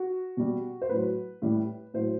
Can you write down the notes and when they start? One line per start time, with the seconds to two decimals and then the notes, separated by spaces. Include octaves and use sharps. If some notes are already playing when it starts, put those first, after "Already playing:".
Already playing: F#4
0.37 B2 G3
0.82 C5
0.89 A2 F#3 B4
1.42 A2 G3
1.94 A2 F#3 C5